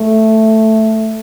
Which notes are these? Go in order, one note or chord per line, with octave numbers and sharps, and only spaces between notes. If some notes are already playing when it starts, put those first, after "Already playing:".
Already playing: A3